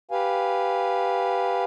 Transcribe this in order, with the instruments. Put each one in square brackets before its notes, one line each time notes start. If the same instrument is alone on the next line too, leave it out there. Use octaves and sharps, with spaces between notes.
[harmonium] G4 B4 F5 G#5